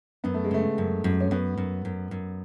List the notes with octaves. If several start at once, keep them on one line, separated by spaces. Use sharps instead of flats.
F#2 B3
A3
G#3
C#3 A3
F#2
F#2
C#4
F#2 B3
F#2
F#2
F#2